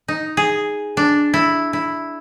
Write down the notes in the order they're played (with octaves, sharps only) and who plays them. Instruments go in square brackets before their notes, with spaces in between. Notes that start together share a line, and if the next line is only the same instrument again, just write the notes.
[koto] D#4
G#4
D4
E4
E4